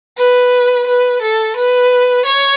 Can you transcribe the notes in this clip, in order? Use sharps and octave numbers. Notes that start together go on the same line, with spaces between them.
B4
B4
A4
B4
C#5